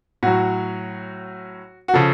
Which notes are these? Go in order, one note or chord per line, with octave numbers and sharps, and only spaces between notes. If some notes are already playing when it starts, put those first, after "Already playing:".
A2 F#3 F#4
F#4
C#3 F3 A4